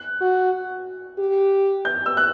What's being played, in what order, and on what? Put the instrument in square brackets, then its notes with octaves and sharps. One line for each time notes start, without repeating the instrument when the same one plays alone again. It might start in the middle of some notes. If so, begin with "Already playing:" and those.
Already playing: [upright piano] F#6
[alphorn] F#4
G4
[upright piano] G6
E6
F#6